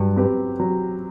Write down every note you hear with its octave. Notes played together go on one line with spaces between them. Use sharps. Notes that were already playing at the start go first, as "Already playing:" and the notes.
Already playing: G2 F#3
C4 G4 B4
F#3